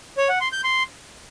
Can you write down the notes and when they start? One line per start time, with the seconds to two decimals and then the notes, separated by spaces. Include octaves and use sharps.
0.17 C#5
0.29 F#5
0.41 C6
0.52 G6
0.64 C6